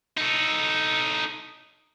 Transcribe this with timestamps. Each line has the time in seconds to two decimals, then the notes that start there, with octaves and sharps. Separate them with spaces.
0.17 D#4 A4